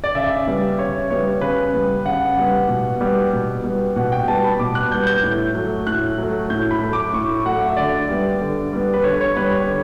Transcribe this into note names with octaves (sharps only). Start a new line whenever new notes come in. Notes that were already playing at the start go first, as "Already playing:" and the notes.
D5
C#3 E5
G3 B3
C#3 C#5
G3 B3 C#5
C#3 B4
G3 B3
C#3 F#5
G3 B3
B2
G3 B3
B2
G3 B3
B2 F#5
G5
G3 B3 A5
B5
B2 D6
F#6
G3 B3 G6
G6
A2
F#3 A3
A2 F#6
F#3 A3
A2 G6
B5
F#3 A3
D6
A2 C#6
F#3 A3 F#5
E5
D3 D5
G3 B3
D3
G3 B3
B4
D3 C#5
C#5
G3 B3 B4
C#5
D3